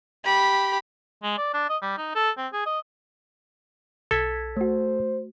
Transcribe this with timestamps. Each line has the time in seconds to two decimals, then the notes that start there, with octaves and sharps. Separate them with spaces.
0.24 G4 B5
1.23 G#3
1.38 D5
1.54 D4
1.70 D#5
1.82 G3
1.98 D#4
2.15 A4
2.38 C4
2.53 G#4
2.66 D#5
4.11 B1 A4 G#6 B6
4.57 A3 F#4 C5